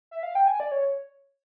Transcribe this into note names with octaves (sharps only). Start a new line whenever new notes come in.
E5
F5
G5
G#5
D5
C#5